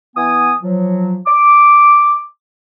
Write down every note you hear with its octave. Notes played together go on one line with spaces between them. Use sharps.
E3 B3 G#5 D#6
F3 F#3
D6